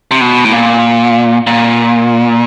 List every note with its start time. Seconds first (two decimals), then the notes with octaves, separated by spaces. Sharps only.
0.11 C3
0.21 B2
0.45 A2
0.52 A#2
1.47 A#2